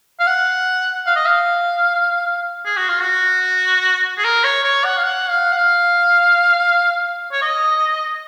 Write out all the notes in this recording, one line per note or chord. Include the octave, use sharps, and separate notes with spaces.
F5
F#5
F5
D#5
F5
G#4
F#4
F4
F#4
G#4
A#4
C#5
C#5
F#5
F5
F#5
F5
F#5
F5
C#5
D#5